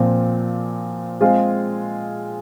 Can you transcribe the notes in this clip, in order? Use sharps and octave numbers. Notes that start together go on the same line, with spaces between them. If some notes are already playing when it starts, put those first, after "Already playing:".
Already playing: A#2 F3 C4
G#3 C4 F4 G#4